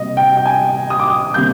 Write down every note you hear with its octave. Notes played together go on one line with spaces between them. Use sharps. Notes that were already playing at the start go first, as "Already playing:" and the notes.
Already playing: C3 G3 A#3 D#5
G5
G5
G#5
D#6
D6
D#6
C3 G3 A#3 G6